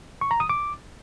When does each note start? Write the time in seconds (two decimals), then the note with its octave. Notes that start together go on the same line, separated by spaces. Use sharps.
0.21 C#6
0.31 A#5
0.40 D#6
0.49 D6